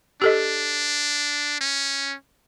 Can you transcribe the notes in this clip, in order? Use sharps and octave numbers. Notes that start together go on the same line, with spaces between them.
D4 G4 A4 D#5
C#4